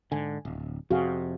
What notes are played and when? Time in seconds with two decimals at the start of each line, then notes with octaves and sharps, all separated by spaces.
0.12 G#2 D3 G#5
0.45 D1
0.91 F2 C3 F#4 G#4 F5